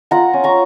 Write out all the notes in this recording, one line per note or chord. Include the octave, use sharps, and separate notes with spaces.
F4 F#5 A#5
C#4
A#5 C#6